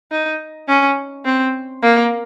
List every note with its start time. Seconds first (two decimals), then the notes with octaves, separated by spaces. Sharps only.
0.12 D#4
0.68 C#4
1.25 C4
1.82 A#3